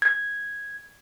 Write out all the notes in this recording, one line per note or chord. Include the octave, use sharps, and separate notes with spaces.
G#6